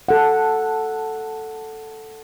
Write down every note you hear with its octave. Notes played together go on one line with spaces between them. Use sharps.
A4 F#5